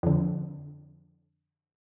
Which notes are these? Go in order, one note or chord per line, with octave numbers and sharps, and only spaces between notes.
F2 D3